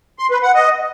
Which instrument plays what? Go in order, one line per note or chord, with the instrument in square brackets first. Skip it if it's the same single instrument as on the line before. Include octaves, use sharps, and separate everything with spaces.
[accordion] C6
B4
F#5
D#5